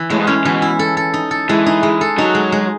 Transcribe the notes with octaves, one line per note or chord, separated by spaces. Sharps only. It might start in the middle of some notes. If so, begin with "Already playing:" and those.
Already playing: E3 E4
A2 G#3
G#2
A2 C#4
B2 E3
E4
A4
A4
D#4
A4
E3 G#3
D#4
G#3
A4
F#3 D#4
G#3
G#3